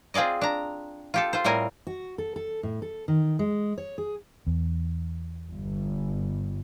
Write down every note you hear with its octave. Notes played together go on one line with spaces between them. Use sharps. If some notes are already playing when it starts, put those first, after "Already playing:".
C4 F4 G#4 D5 D#5
D4 A#5
F4 G4 A4
F4 C5
A2 G3 C4 A#4 G#5
F#4
A4
A4
A2
A4
D#3
G#3
C#5
G#4
E2
G1